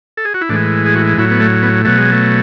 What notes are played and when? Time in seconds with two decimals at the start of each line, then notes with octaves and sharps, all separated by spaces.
0.17 A4
0.25 G#4
0.34 F#4
0.41 E4
0.49 A2 E3 G#3 D4
0.86 G#4
0.95 F#4
1.18 A2 F#3 E4
1.31 B3
1.40 A3
1.63 B3
1.85 B2 F#3 A3
1.98 G#3
2.12 A3